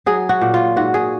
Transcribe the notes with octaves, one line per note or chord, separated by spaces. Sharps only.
F#3 G#4
F#4
A#2
F4
G#2 F#4
G#4